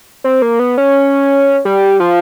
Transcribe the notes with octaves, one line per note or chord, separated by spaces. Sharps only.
C4
A#3
B3
C#4
G3
F3